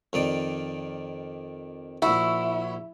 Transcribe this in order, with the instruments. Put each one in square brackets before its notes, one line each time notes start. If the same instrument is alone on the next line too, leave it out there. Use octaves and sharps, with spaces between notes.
[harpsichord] F2 D#3 D5
[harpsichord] A#1 F#4 [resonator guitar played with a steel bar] E4